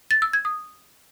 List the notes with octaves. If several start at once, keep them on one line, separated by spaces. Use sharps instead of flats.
A6
E6
G#6
D#6